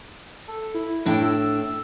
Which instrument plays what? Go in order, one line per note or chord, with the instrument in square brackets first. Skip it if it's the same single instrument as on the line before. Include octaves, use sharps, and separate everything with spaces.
[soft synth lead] A4
E4
[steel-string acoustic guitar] A2 D4 G5 [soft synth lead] E4
[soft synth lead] E6